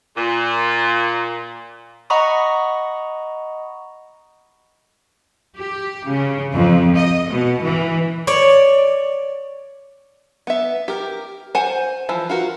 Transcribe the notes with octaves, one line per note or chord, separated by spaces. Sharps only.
A#2
D#5 F#5 A#5 B5 C#6 D#6
G4
C#3
F2
D#5
B2
E3
C#5 D5
B3 E5
G4 A#4
C5 F#5 G#5
E3 F3
F4 F#4 A#4